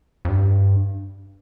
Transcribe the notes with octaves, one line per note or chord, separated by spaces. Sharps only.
F2
G2